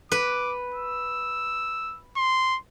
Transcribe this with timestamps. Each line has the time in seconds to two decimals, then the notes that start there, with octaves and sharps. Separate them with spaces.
0.12 B4 D6
0.74 E6
2.17 C6